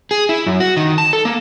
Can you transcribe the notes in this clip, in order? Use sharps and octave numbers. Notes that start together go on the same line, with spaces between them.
G#4
E4
F#2
F#4
D#3
A5
A4
A#3